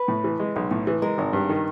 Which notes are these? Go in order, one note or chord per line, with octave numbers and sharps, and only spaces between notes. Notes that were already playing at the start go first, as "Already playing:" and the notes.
Already playing: B4
A2
E3
G#3
B1
A2
E3
G#3 A#4
G#1
G2
D#3